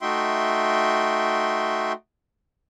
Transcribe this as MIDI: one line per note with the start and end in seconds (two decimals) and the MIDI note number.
0.01 1.93 57
0.01 1.93 63
0.01 1.93 66
0.01 1.93 76
0.01 1.93 79
0.01 1.93 84